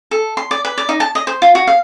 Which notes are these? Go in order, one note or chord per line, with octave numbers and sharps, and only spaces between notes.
A4
C6
D5
B4
D5
D#4
A5
D#5
C5
F4
F#4
F5